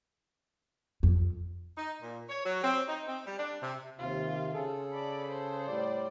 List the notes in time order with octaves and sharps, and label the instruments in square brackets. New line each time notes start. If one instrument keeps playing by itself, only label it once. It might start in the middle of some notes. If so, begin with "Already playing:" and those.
[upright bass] F2
[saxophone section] D#4
A#2
C#5
F#3
C4
D#4
C4
G3
D4
C3
[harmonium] D#2 C3 [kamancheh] F4
[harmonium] C#3 G#4 A4
[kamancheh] D5 B5
C5
[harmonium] A2 G3 D5